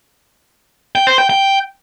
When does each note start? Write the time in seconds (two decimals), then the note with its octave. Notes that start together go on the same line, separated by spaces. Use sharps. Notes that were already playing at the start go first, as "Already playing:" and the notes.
0.95 G5
1.07 C5
1.18 G5
1.30 G5